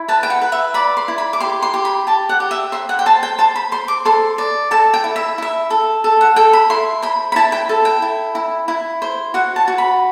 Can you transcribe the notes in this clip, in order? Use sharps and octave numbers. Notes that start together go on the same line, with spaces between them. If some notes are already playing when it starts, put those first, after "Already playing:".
Already playing: E4
B4 A5
G5
F#5
B4
E5
D5 B5
C6
E4
B5
D6
G4 C6
C6
G4
B5
G4 A5
F#5
G4
E5
C5 E5
F#5
G5
C5 A5
G5
C5 A5
B5
C5 C6
D6
A4 C6
D5
A4 A5
G5
E4
E5
E4 E5
A4
A4
F#5
A4 G5
B5
E4 C6
C5 B5
B5
E4 A5
G5
A4 A5
G5
E4
E4
E4
C5
F#4 F#5
A5
F#4
B5